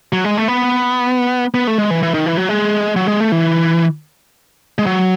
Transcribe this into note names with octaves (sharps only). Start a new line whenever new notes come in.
F#3
G#3
A3
B3
B3
A3
G#3
E3
E3
D#3
E3
F#3
G#3
F#3
G#3
A3
E3
G#3
F#3